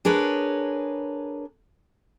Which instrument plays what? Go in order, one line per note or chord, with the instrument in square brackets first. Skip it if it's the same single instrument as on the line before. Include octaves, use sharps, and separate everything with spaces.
[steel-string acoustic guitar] D4 G#4 A#4 B4 C#5